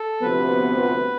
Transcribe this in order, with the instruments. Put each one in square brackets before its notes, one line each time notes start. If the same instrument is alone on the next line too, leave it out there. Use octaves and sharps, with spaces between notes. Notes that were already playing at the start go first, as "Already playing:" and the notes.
Already playing: [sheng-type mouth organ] A4
[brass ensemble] D2 C3 F3 B3 [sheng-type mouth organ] B4